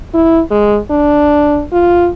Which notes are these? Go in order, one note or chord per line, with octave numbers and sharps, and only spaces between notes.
E4
G#3
D4
F4